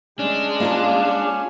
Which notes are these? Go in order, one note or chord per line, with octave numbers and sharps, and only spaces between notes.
G#3 C#4 D4
A#3 F4 A5